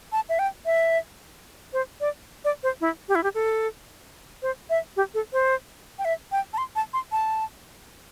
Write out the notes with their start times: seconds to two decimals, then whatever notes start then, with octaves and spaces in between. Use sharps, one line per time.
0.12 A5
0.29 E5
0.39 G5
0.66 E5
1.73 C5
2.01 D5
2.45 D5
2.63 C5
2.81 E4
3.09 G4
3.15 E4
3.23 G4
3.35 A4
4.42 C5
4.70 E5
4.97 G4
5.14 A4
5.33 C5
5.99 G5
6.05 E5
6.32 G5
6.53 A5
6.58 C6
6.76 A5
6.93 C6
7.12 A5